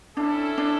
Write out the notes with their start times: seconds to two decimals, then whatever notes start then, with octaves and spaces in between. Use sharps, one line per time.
0.17 C#4 D4 E4 A4
0.58 D4